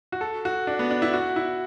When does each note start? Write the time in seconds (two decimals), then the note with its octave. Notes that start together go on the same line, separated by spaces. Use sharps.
0.12 F#4
0.21 A4
0.45 F#4
0.67 D4
0.79 B3
0.91 D4
1.02 E4
1.13 F#4
1.36 E4